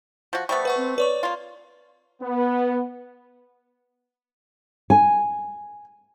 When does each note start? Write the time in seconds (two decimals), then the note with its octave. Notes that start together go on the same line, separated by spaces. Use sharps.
0.33 F3 F#4
0.49 G3 A3 B3 C5 C#6
0.65 B4 F#5 C#6
0.77 C4
0.98 B4 C#5 D5 C#6
1.23 A#3 F4
2.22 B3
4.90 G#5